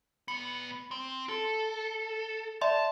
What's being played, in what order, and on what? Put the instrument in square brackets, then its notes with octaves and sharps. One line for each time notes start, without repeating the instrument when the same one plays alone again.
[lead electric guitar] A#2 B3 [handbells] C#7
[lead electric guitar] C4
A4
[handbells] D5 E5 C6 [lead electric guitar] A5